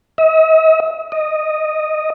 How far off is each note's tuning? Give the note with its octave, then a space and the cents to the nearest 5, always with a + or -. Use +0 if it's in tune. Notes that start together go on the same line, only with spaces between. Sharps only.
D#5 +45
D#5 -5